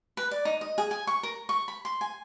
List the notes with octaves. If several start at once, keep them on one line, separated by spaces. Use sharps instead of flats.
B4
D5
D#4
D#5
G#4
G#5
C#6
A#4
C#6
B5
C6
G#5